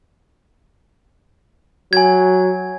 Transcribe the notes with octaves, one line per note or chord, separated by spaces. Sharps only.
F#3 G#5 G#6